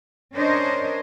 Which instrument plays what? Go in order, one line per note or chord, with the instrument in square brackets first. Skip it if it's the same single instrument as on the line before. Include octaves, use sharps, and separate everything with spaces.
[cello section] C#4 D4 A#4 C5 C#5 D#5